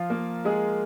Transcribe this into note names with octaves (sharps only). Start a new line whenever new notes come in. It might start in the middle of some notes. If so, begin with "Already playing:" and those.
Already playing: F3 F4
A#3 A#4
G#3 G#4